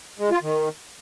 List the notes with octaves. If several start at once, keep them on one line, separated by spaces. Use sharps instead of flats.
G#3
F4
D#3